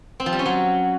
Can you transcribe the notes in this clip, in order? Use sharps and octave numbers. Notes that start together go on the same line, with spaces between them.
C4
F3
G3
C#4
F#3